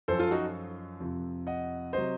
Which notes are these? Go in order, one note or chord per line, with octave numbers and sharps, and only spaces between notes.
F#2 F3 A4 C5
F4 A4
D#4 F#4
F2 C3 F3
D#5 F#5
C3 F#3 C5 D#5